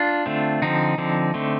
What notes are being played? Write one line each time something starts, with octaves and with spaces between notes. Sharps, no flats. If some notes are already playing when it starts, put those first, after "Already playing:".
Already playing: D4 F4
D3 A3 C4
D3 F3 C4 D#4
D3 F3 C4
D3 A3 C4